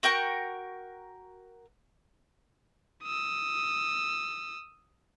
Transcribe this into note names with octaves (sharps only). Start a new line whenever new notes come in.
F#4 A#4 G5 C#6
D#6 E6